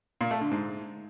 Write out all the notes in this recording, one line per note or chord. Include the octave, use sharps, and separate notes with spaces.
A#2
A3
D3
G#2